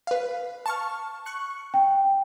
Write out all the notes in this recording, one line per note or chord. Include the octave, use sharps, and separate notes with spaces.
B4 F5
A5 C#6 F6
C#6 F#6 C#7
G5